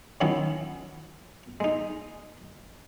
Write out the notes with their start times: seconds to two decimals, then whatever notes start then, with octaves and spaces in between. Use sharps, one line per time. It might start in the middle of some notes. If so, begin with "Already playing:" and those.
0.21 D#3 F3 F#3 C#4 D#4 E4
1.60 G#3 D#4